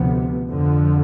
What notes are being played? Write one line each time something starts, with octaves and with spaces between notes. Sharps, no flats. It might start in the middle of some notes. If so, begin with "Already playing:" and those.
Already playing: D2 C3 F3 B3
F2 D3 F3